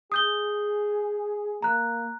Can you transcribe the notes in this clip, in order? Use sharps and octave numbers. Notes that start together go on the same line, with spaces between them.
G#4 D#6 G6 G7
A#3 A#5 F#6